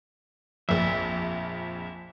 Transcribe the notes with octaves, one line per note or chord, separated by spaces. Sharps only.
A#1 F2 E5